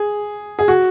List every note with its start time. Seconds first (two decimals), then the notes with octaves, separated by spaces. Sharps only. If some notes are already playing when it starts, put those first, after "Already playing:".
Already playing: G#4
0.59 G#4
0.68 F#4